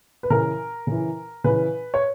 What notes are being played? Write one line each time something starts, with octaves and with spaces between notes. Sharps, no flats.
B4
C#3 E3 A#4
C#3 E3
C#3 E3 B4
C#5